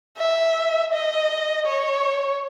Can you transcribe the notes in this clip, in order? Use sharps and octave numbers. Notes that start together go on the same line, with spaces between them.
E5
D#5
C#5